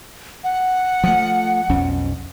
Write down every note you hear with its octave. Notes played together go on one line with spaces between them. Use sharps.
F#5
F3 A3
B1 F2 C#4